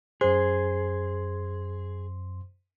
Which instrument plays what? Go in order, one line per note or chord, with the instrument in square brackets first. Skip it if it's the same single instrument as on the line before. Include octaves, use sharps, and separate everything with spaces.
[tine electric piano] F#2 C6 [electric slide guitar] G#4 [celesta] C5